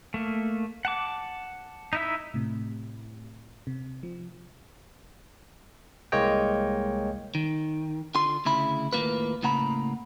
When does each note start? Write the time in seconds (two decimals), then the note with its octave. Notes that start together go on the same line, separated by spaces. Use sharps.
0.14 A3 A#3
0.85 F#5 A5 D6
1.93 D#4 E4 E5
2.34 A2 C3
3.67 C3
4.03 F3
6.12 C2 G#3 A#3 C#5 D#5 G5
7.35 D#3
8.15 D3 F4 C6
8.45 D2 C#3 E4 B5
8.93 D#2 A2 C3 A#3 F4 B4
9.43 A2 C#3 A#3 F#5 A#5 B5